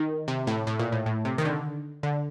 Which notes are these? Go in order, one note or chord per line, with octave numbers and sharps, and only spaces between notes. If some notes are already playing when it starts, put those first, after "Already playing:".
Already playing: D#3
C3
A2
A2
A#2
A2
A2
C3
D#3
D3
D3